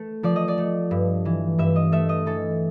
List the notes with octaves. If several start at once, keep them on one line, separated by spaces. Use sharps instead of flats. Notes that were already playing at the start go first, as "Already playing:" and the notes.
Already playing: A3
F3 D5
D#5
D5
A3
G2
E3
G2 E5
D#5
A3 E5
D#5
E3 A4